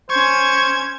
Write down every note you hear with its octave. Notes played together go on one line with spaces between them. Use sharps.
C#4 C5 C#6 G#6